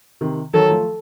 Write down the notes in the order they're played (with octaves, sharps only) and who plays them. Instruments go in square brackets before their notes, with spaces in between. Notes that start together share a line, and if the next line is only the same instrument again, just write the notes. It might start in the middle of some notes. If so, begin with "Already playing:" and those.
[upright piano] C3 D#3
[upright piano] D#3 F#3 [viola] A4
[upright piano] F3 A3